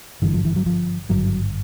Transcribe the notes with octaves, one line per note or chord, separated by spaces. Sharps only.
G#1 G2 D3 E3
F3
E3
F#3
F3
G#1 G2 D3 F#3